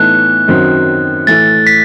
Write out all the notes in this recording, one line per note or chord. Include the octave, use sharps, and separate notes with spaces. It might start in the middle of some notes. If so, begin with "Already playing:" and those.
Already playing: A2 E3 B3 D#4 A4 F#6
F#2 D#3 F#3 C4
A2 E3 A3 A6
B6